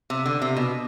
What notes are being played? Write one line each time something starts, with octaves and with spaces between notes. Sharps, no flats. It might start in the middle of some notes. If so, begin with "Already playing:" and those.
C3
D3
C3
B2